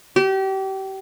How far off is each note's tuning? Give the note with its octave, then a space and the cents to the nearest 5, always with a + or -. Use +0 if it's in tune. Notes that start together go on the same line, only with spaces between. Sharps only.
G4 -30